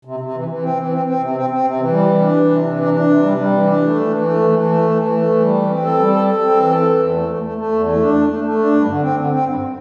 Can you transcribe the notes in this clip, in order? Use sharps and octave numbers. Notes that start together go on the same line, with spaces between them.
C3
C3
E3
E3
C4
E3
C4
C4
C3
C4
C4
C3
E3
G3
E3
D4
E3
C3
E3
D4
D4
C3
G3
G3
E3
D4
A3
E3
E3
A3
E3
E3
A3
E3
E3
A3
E3
G3
E3
C4
A4
G3
A4
A4
C4
E3
A4
E3
E2
A3
A3
A3
A3
E2
A3
D4
A3
A3
A3
D4
G2
D3
C4
D3
C4
G2